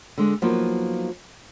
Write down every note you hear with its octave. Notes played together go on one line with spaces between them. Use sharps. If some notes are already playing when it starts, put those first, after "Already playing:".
D3 G#3
F3 F#3 A#3 B3 D#4